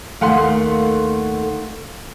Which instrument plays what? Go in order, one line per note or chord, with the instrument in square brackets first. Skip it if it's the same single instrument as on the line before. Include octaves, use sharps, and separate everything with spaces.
[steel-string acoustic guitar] D#2 D#3 A3 [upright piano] F5 F#5 C6